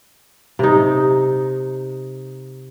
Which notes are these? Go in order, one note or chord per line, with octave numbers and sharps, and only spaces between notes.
C3 D#4